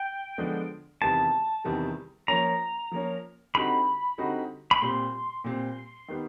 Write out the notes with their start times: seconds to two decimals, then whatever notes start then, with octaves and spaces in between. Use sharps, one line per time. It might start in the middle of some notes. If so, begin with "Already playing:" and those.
Already playing: G5
0.38 D3 F3 G#3 B3 D4
1.01 E2 C3 D#3 G3 B3 A5
1.64 E2 C3 D#3 G3 B3
2.28 F3 A#3 C#4 A#5
2.92 F3 A#3 C#4
3.55 D3 G3 C4 D#4 F#4 B5
4.18 D3 G3 C4 D#4 F#4
4.71 B5
4.82 A#2 G3 C4 C6
5.44 A#2 G3 C4
6.08 D#3 G3 B3